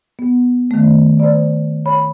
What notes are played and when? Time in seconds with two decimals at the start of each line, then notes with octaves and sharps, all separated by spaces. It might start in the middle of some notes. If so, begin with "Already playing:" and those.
0.19 B3
0.71 D#3 A3
1.19 C5 D5
1.86 C#5 B5